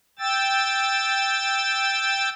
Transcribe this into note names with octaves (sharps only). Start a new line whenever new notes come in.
G5 E6 A6